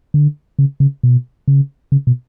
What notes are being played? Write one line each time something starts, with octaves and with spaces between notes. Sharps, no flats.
D3
C#3
C#3
B2
C#3
C#3
B2